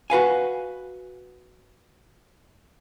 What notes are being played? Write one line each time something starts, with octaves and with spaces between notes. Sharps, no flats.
F#4 B4 F5 G#5